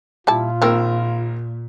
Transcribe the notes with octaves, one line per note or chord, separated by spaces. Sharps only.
A#2 G3 E4 F4 A5
A#1 D#3 C4 A#4 E6